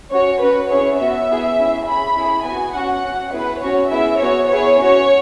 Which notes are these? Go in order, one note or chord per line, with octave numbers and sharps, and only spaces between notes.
C#4 F#4 C#5
C#4 F#4 B4
C#4 E4 G#4 C#5
B3 F#4 E5
B3 E4 G#4
C#4 E4 G#4
C#4 G#4 B5
C#4 E4 G#4
B3 F#4 G#5
C#4 F#4 F#5
C#4 F#4
B3 E4 G#4 B4
C#4 F#4 C#5
B3 E4 G#4 E5
B3 F#4 C#5
B3 E4 G#4 C#5
C#4 F#4 C#5